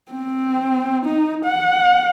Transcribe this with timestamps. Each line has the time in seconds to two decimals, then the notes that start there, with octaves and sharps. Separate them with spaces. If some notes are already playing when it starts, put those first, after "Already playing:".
0.12 C4
1.06 D#4
1.45 F#5